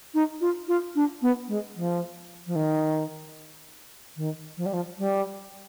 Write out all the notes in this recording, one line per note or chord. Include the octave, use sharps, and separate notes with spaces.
D#4
F4
F4
D4
B3
G#3
F3
F3
D#3
D#3
F3
G3
F3
G3